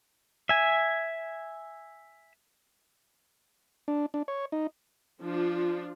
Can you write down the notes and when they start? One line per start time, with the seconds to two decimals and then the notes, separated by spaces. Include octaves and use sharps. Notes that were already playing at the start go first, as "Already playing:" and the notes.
0.49 E5 G#5
3.88 D4
4.14 D4
4.28 C#5
4.52 D#4
5.21 F3 D4 F4